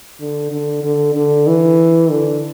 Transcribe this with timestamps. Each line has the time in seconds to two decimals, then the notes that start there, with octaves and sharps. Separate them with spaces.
0.20 D3
0.52 D3
0.84 D3
1.15 D3
1.47 E3
2.10 D3